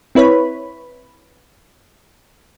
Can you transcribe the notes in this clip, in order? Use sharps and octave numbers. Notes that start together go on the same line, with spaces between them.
C4 E4 B4 C#5 B5